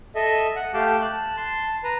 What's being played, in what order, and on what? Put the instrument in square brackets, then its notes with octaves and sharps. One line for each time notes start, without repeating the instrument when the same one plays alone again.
[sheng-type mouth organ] A4 D#5 E5
F#5
A3 G4 F5 G5 A5
A5 F#6
A5 C6
B4 A#5